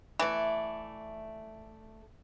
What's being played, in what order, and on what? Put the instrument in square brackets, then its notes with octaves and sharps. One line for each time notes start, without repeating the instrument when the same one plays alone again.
[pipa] E3 [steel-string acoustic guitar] A3 D5